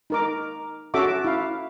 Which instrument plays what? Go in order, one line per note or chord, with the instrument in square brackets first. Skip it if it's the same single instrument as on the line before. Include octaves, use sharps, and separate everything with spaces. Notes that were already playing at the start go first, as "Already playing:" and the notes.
[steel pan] D#4 A#4 D6
C#4 F#4 A4 E5 D6
E4 F5